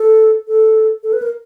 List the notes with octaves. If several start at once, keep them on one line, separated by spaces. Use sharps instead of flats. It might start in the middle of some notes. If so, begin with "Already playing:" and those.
Already playing: A4
A4
A4
B4
A#4